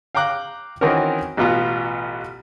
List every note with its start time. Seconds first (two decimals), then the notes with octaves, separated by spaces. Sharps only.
0.15 F5 G5 A#5 D6 F#6
0.81 D#3 E3 C4 C#4 F#4 A#4
1.37 A1 B2 B3 F4 A#5